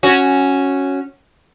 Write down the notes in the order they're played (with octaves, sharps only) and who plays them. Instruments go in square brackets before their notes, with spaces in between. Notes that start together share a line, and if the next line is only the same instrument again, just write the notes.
[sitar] C#4 F#4